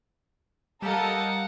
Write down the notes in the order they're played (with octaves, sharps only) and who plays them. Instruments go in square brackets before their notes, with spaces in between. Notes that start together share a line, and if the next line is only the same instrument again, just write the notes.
[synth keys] G3 G4 G6 [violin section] A4 A#4 D#5 [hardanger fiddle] F5 F#5